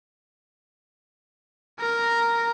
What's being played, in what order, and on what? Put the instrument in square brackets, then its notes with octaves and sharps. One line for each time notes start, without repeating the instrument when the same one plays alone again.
[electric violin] A#4 A#5